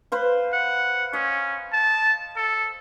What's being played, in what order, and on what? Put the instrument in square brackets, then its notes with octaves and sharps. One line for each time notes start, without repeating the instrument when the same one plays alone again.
[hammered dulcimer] B4 C5 F5
[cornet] F#5
[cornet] C#4 [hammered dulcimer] D#5
[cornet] A5
A4